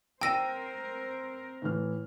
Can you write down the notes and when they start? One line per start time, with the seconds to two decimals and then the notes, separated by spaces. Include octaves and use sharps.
0.21 C4 A#4 C5 G5 E6 A#6 D#7
1.62 A2 E3 F6